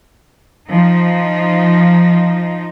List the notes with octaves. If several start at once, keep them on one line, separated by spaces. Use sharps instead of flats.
F3 D#4